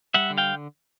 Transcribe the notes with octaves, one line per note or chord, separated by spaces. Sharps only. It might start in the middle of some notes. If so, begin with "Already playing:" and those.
G3 E5 F#5
D3
F5 G5